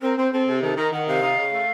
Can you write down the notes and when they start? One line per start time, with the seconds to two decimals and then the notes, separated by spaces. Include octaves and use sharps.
0.02 C4 A#4
0.17 C4 C5
0.33 C4 A4
0.47 C3 A4
0.62 D#3 A4
0.77 D#3 A#4
0.92 D#3 F#5
1.07 C3 F5
1.22 D#4
1.37 C#3
1.52 A3